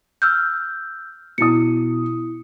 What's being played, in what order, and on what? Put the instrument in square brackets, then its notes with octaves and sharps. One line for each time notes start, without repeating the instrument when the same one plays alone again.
[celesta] E6 F6 G6
[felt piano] B2 D#6 [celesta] E4 C#7